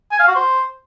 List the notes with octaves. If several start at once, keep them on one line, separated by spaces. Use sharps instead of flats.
G#5
F5
F#4
C5